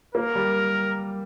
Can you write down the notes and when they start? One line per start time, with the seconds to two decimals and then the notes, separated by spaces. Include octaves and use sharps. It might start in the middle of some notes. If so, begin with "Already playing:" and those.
0.15 A#3 A#4
0.35 G3